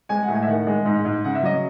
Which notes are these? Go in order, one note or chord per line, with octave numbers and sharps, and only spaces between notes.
G#3 G#5
F#5
A2
G#5
E5
D#3 F#5
G#3
G#2
G#2
C#3 F#5
E5
F#3 D#5